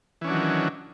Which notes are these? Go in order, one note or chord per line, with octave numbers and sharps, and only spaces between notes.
D#3 E3 F#3 C#4 D4